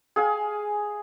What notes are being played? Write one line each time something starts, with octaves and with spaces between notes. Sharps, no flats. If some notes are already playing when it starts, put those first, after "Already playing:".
G#4 F5 G#5